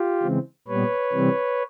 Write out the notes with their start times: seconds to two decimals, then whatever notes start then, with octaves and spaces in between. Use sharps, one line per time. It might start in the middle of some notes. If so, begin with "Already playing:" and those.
Already playing: F4 G4
0.22 C#3 E3 G#3 C4
0.68 A#2 G3 B3 B4 C#5
1.13 C3 E3 G3 C4